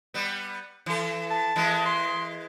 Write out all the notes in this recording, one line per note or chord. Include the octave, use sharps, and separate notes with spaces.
G3 B3
E3 A4
A5
E3 G#3 A#3
C6